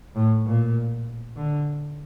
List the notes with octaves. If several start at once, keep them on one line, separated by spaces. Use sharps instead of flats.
A2
A#2
D3